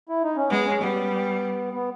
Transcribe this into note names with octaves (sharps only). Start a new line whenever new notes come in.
E4
D#4
C#4
G#3 B3
C#4
G3 B3
B3